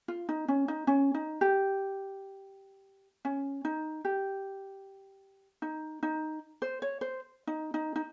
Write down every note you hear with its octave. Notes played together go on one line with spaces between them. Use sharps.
F4
D#4
C#4
D#4
C#4
D#4
G4
C#4
D#4
G4
D#4
D#4
C5
C#5
C5
D#4
D#4
D#4